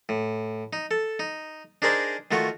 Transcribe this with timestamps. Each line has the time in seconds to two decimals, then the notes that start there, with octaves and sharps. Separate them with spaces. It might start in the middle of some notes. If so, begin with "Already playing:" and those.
0.09 A2
0.73 D#4
0.91 A4
1.19 D#4
1.82 D4 D#4 G#4 A#4 C5 D5
2.31 D#3 A3 F4 F#4